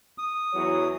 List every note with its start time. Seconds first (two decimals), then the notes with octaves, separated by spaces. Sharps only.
0.18 D#6
0.53 E2 F#3 C#5